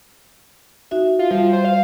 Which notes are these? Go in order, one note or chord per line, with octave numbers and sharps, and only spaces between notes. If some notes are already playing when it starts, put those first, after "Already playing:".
D#4 F#4 E5
F4
F3 G3
C5
F5